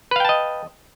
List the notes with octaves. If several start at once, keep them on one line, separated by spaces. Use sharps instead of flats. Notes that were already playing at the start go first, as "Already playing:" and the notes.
B4 D#5 F5 G5 A5